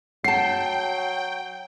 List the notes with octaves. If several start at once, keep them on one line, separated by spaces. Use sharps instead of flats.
F#3 F#5 G5 A5 C7